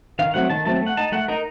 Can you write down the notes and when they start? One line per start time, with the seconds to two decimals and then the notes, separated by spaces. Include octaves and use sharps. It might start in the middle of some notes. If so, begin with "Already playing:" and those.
0.19 D#3 F5
0.34 F#3 A3 C4 F#5
0.50 D#3 A5
0.65 F#3 A3 C4 A5
0.81 A3
0.87 F#5
0.97 D#4 A5
1.12 A3 F#5
1.28 D#4 A#4